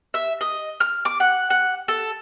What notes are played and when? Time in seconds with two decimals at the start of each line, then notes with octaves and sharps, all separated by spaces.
0.14 E5
0.41 D#5
0.80 F6
1.05 D6
1.20 F#5
1.50 F#5
1.88 A4